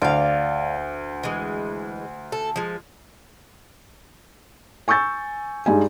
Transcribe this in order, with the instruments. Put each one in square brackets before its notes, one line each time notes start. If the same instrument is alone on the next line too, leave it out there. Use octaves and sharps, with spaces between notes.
[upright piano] D2 [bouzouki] D5 F5
[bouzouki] E3 G#3
A4
F3 G#3
[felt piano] G#5 C#6 E6 G6 A6
G2 G3 G#3 D#4 G#5